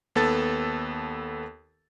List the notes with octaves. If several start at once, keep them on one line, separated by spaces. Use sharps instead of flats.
D#2 B3 A4 A6